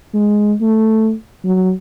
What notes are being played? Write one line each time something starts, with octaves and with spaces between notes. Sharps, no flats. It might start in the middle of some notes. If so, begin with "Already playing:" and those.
G#3
A3
F#3